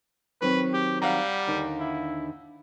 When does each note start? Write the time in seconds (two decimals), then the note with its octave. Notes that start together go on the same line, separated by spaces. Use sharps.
0.42 D#3 F#3 C4 B4
0.73 G4
1.02 G3 F5 F#5 A#5
1.47 D#2 D3 D#4
1.80 E4